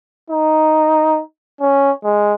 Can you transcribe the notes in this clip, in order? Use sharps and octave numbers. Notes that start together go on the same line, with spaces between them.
D#4
C#4
G#3